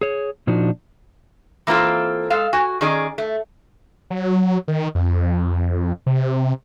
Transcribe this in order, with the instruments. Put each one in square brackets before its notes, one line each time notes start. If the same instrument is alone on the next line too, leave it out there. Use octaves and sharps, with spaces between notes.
[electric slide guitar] G#4 C#5
A#2 F3 D4 D#4 F#4
[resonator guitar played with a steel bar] E3 A#3 C4 F4 A4
G#3 A4 F5
F#4 G#5
D#3 C#4 G#4 D5 D#5
A3
[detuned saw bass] F#3
D#3
F2
C3